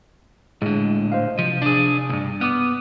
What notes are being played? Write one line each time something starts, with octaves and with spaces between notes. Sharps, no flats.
A2 D3 G#3
C5 D#5 F5
C3 F3
D4 G#4
B1 G2
B3 D6 D#6 F6